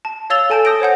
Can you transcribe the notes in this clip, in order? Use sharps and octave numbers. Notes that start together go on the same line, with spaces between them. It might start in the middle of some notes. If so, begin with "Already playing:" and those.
A5
C#5 F5 E6 A6 F7 G7
A4 G#5 A5 G6 D7
D#6 G6 A#6 D7
C5 C#5 F#5 G6